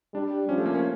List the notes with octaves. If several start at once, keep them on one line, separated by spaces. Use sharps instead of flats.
G3 D4
F3 C#4
A3
A#3
C#4